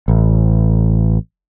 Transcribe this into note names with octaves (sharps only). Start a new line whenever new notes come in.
A1